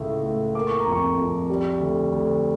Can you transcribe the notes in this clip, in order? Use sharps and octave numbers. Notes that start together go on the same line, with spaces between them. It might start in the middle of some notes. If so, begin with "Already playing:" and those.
Already playing: C#2 A2 A3
A2
A#3 D6
C#6
A#5
F2
C#6
F2
G3
D2
D2